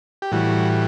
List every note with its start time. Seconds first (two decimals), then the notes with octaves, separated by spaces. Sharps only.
0.22 G4
0.32 A2 E3 G3 F#4